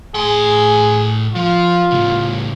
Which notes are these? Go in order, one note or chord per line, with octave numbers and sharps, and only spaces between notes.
A2 G#4 C6
F3 F4
A2 C#3